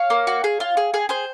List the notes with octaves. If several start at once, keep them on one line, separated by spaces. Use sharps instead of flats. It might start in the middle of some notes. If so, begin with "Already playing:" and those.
Already playing: C#5 F5
A#3
F#4
G#4
F4
G#4
G#4
G#4 C5